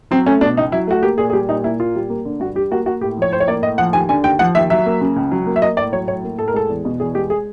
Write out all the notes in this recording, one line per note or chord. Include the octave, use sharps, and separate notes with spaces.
F#3 C4
A3 C#4
B2 D4
C#2 D#4
F#3 E4
A3 F#4
A#3 G4
A#2 G#4
G#4
G3 G4
A#2 D#4
A#3 E4
A#2 F4
G3
A#3
D3
G2 F#4
G3 G4
A#3 F#4
A#3 F#4
A2 G4
F3 C#5
A2 C5
C#5
A#3 D5
A2 D#5
F3 F#5
D#2 G#5
D3 G#5
D#2 G5
F3 F#5
D#2 E5
F#3 E5
A#3
C#3
C#2
F#3
A#3
E5
A#3 D#5
A2 D5
F#3 C#5
A2 C#5
A#3
A2 A4
A#4
G#3 A4
E2
B2
E2 G#4
G#3 G4
G#4